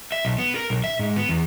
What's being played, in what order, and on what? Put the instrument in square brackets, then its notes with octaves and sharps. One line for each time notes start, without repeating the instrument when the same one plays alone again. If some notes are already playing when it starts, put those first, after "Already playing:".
[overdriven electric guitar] E5
B1
B3
A#4
B1
E5
G#2
B3
E2